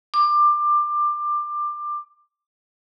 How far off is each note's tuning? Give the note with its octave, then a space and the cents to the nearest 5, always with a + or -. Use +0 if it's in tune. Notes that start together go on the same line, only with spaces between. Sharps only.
D6 +20